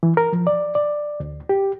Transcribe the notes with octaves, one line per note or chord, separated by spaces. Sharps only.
E3
A#4
F3
D5
D5
D2
G4